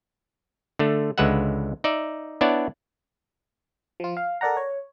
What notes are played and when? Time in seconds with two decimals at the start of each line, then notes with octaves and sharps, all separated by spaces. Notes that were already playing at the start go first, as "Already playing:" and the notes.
0.79 D3 A3
1.18 C#2 D3 G#3 B4 E5 F#5
1.84 D#4 D5 E5
2.41 B3 D4 E4 C#5 D5 A5
4.00 F3 F4
4.17 F5
4.41 A4 A#4 D5 F#5 A#5
4.57 C#5